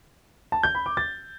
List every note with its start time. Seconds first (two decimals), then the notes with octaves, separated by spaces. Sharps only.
0.52 A5
0.63 G6
0.75 B5
0.86 D6
0.97 A6